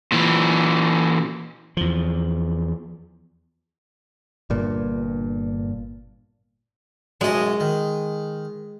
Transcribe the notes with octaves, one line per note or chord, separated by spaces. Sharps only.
A#2 E3
E2 F3
G1 G2 A#2
B1 F#2 G#3 D#5 A5
D#3